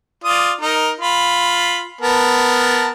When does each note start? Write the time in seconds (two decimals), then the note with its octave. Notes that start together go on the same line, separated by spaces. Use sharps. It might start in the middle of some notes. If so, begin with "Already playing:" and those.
0.24 F4 D5 D#6
0.61 D#4 A#4
1.01 F4 B5
2.01 B3 A#4 A5